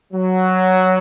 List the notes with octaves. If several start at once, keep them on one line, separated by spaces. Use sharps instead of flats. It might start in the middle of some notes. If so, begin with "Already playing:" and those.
F#3